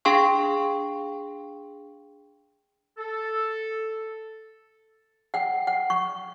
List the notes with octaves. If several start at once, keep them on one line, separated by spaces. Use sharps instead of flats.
D4 G#4 F5 G5 C6 C#6
A4
F#5 G5
F#5
C#6